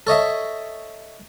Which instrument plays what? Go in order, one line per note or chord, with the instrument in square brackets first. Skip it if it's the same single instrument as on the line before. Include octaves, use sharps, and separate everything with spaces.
[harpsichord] A4 C#5 D#5 E5